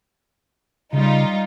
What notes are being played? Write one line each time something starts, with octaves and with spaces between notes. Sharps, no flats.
C#3 G3 D#4 F4